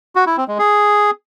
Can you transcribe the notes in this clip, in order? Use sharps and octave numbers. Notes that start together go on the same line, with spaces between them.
F#4
E4
C4
G#3
G#4